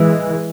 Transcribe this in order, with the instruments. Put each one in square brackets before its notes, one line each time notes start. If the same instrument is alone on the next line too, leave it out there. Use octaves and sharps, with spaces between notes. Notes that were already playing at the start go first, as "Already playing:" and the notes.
Already playing: [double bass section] E3 G#3